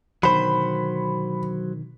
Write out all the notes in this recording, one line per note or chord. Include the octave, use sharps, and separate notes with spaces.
B2 D3 D#3 F#3 C5 B5